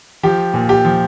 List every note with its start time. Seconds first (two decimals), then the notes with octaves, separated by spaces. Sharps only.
0.23 F3 G4
0.54 A#2
0.69 G4
0.85 F3